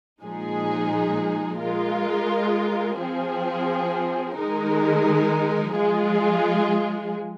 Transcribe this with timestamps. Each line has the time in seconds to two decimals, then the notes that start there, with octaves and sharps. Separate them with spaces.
0.21 A#2 F3 G#3 D#4 G#4
1.60 G#3 F4 A#4
2.99 F3 C4 G#4
4.37 D#3 G#3 D#4 A#4
5.76 F3 G#3 F4 G#4